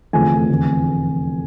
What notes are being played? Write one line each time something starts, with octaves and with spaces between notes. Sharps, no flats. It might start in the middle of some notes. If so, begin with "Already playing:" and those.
F1 E2 D3 F3 A3 G#5
F1 E2 D3